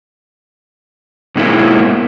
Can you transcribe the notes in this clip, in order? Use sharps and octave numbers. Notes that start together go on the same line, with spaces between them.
G#2 B2 G#3 A#3 E4